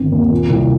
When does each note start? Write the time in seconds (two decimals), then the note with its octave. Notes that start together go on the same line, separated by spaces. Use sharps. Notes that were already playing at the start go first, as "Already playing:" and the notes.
Already playing: G1 D#3 C4
0.12 D#2
0.31 A#2
0.50 C2